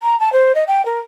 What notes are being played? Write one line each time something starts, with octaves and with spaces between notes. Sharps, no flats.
A#5
A5
C5
D#5
G5
A#4